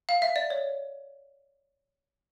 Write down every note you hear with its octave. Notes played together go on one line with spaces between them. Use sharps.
F5
E5
D5
C#5